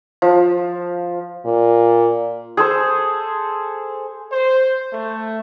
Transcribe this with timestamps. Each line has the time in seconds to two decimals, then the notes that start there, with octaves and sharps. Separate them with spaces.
0.22 F3
1.45 A#2
2.57 G#4 A4 C5
4.32 C5
4.93 A3